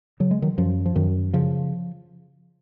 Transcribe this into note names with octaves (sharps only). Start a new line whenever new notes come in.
C#3 F#3
G#3
D#3 F#3
F#2 F3
F3
F#2 D#3
C#3 F3